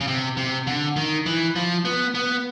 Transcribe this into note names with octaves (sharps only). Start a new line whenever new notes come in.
C#3
C3
C3
D3
D#3
E3
F3
B3
B3